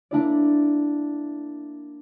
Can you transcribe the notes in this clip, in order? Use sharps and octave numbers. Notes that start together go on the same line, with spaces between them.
A#3 D4 E4 D5